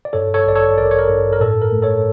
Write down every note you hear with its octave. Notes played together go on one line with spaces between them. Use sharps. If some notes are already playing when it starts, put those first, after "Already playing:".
D5
G2 A4 C#5
A4 C#5
A1 D5
A4 C#5
A1 A#4 D5
C#5
A#4
G2
A#4
A2 A4
A#4
A3
A4 C#5